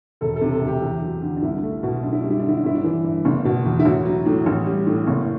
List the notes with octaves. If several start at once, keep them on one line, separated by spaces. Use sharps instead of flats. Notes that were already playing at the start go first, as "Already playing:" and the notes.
E1 A4
A4
C3
A4
D2
G4
E2
F#3
D3
D4
C2 E4
A3
B2
F#2 D4
E4
G3 D4
E4
D4
D3 E4
D4
G1 E4
D4
E3
G2
F#1 D4
B2
E2
E4
A1 F#4
F#3
A2
A1
G3
A2
F#1